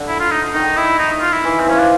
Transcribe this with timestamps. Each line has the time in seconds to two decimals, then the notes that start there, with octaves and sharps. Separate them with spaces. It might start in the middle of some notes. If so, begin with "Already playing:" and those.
Already playing: D3
0.08 E4
0.20 F4
0.31 D#4
0.54 D#3 D#4
0.77 E4
0.99 D#4
1.21 F4
1.33 E4
1.44 E3
1.60 C4
1.67 F3 C#4
1.80 D4